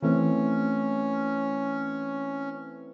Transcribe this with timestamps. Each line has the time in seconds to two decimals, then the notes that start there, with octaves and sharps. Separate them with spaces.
0.02 E3 A3 C4 C#4